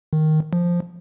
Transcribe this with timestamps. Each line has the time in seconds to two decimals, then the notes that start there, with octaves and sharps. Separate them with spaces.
0.13 D#3
0.53 F3